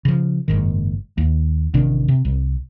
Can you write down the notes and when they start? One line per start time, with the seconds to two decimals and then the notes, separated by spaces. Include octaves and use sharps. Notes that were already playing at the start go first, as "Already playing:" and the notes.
0.05 C#3 F3
0.48 F#1 G#2 D#3
1.18 D#2
1.74 A1 C3 D#3 D4
2.08 C3
2.25 C2